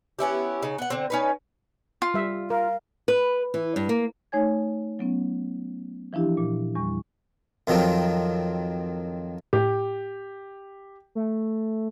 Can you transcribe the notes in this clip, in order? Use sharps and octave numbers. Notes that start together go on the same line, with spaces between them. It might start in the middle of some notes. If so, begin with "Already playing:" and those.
B3 C#4 E4 G4
C#3 D#4
B3 F#5
D3 C4
C#4 D#4 B4
F4
G3 E5
A#4 F5
B4
E3
G2
A#3
A3 D#4 C#5 G#5 G#6
F#3 B3 C#4
E3 F3 D4 E4 G4
A#2
E2 G3 C#6
F2 D#3 F3 F#3 C4
A2 G4
A3